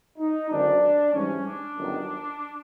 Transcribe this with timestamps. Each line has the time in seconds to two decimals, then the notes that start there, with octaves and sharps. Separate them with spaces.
0.19 D#4
0.49 G#1 F#2 D3 D4
1.13 G#2 E3 G3 C#4
1.44 D4
1.76 G1 F#2 D#3